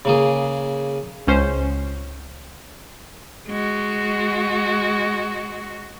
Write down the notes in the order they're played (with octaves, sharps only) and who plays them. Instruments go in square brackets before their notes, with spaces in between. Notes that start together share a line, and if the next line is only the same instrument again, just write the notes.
[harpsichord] C#3 A#3 G#4
[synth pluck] C#2 C#4 C5
[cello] G#3 F#4